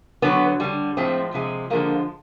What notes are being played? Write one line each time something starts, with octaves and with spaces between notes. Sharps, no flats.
D3 F#3 B3
D3 G3
A2 F3 G#3 C4
C3 F3 G#3
D3 F3 G#3 A#3